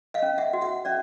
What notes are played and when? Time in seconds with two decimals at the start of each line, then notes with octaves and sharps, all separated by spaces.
0.14 D#5 F5
0.22 C#4
0.38 E5 F#5
0.53 F#4
0.61 E5 F#5
0.85 C#4 D5 E5